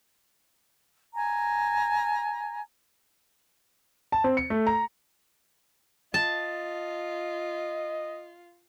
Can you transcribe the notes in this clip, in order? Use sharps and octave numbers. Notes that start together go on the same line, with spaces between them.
G#5 A#5
A5
C4
C#7
A3
A#5
F4 D#5 A5